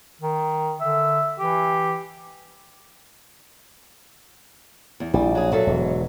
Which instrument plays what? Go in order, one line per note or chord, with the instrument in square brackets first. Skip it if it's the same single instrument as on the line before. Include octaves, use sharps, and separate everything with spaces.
[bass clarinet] D#3
[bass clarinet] D3 [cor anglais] E5
[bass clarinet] E3 [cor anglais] G4
[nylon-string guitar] E2
[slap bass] A#1 [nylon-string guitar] G3
[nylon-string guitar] F#3 G#4
[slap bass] A#2 [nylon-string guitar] F#3 A4 E5
[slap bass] E1 G#2